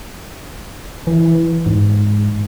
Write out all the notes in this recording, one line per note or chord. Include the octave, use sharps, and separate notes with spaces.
E3
G#2